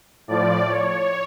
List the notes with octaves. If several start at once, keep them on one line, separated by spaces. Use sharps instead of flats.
A2 F3 D5
C#5